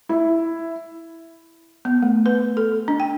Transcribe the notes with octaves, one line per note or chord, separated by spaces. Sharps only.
E4
B3
A3
B4
A4
D4
G5